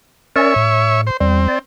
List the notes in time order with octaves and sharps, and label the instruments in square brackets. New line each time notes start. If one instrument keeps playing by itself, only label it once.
[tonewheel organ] C#4 A#4 D5 [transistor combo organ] C#5 E5
[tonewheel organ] A2
[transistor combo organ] C5
[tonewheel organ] E2 G3 [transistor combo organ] C4
[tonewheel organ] D5